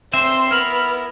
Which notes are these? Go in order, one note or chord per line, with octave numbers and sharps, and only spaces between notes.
C4 C5 E5 C6 C7
B3 E4 A#4 B5 F6